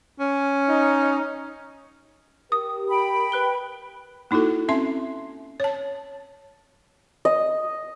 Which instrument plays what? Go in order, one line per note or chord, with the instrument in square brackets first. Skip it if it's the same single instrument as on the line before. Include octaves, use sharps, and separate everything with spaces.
[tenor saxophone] C#4
[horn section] D#4
[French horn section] G4 A#4 [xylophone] D#6
[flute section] G5 B5
[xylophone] B4 F#6 G7
[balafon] A#3 D#4 E4 F#4 A4
C4 C#4 E5 C6
C#5 A5
[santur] D#5